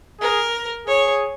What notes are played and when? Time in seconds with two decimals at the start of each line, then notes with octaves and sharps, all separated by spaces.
0.20 G#4 A#4
0.87 G#4 C#5